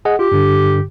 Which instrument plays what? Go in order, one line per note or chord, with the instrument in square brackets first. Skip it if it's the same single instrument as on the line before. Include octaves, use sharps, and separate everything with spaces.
[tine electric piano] G#4 D#5 F#5
[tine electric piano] F4 [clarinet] G4
[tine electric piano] G2 D3